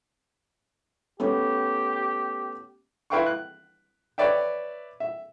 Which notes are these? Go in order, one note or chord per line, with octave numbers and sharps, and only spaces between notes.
A3 B3 C#4 G4
E4 B4 F5 G5 C6 C#6
F#6
B4 C#5 D5 E5 G5
E5